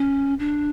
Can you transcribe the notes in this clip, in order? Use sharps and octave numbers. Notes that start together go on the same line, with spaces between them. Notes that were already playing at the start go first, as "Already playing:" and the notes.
Already playing: C#4
D4